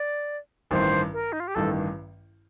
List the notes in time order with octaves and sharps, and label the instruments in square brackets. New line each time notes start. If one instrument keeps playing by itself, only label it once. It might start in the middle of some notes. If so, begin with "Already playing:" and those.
Already playing: [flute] D5
[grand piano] A1 G2 D#3 [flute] C5
[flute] A#4
D#4
F4
G4
[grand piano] A1 G2 D#3 [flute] A4